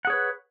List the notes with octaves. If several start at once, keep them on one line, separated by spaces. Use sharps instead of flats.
G#4 B4 C#5 F#5